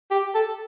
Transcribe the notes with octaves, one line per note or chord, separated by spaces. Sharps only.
G4
A4